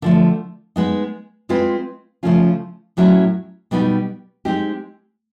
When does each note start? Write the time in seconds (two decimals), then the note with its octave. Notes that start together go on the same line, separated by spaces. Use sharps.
0.02 D3 F3 A3
0.76 G#3 B3 D#4
1.49 G#3 C4 F4 G#4 B4
2.23 C#3 F3 A3 C#4 F4
2.97 A2 F#3 A3 C#4 E4
3.71 B2 G3 B3 D#4 G4
4.45 G#3 C4 D#4 G4